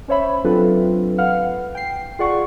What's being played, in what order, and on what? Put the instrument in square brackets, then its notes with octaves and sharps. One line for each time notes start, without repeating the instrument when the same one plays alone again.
[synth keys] C#4 C5 C#5 E5 B5
F#3 C4 D4 F4 A4 B4
B4 F5 F#5 F6
G5 C7
F4 G#4 D5 F#5 C#6